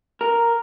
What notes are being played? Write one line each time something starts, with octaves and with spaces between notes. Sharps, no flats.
A#4